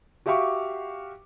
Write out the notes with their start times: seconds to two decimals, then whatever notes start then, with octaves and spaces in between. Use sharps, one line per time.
0.26 F#4 G4 E5 F5 C#6 D6